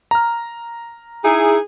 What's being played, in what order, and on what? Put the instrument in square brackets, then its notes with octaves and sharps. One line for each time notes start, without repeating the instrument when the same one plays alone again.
[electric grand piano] A#5 F6
[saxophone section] D#4 E4 G#4